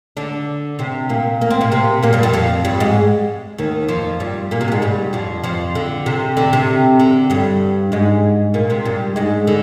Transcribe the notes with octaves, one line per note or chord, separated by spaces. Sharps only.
D3 D4
C3 C4
A#2 A#3
A#3
C4
A#2 A#3
C3 C4
A#2 A#3
G2 G3
F2 F3
F2 F3
G2 G3
G#2 G#3
D#2 D#3
F2 F3
G2 G3
A#2 A#3
C3 C4
G3
G#2 G#3
G2 G3
F2 F3
F2 F3
D3
C3
D3
C3
D3
G2 G3
G#2 G#3
A#2 A#3
C3 C4
G2 G3
G#2 G#3
D3